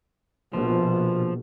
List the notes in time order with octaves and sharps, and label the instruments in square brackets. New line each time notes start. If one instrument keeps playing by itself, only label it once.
[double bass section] A#1 B2 [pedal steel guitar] F3